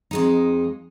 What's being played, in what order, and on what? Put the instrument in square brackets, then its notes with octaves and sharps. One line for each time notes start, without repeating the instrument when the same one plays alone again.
[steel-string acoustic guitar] F2 G#3 D#4